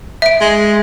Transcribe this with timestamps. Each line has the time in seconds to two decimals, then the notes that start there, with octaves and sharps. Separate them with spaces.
0.22 E5 D7
0.41 G#3